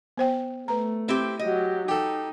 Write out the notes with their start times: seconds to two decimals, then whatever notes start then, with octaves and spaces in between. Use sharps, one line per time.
0.17 B3 C5 G5
0.68 A3 B4 A#5
1.08 C4 E4 G4
1.39 F#3 G4 D#5
1.88 D#4 G4 A4